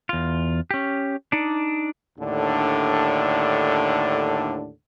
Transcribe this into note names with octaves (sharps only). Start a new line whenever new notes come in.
E2 F4
C#4 G4
D4 D#4 D5
D#2 A2 D3 D4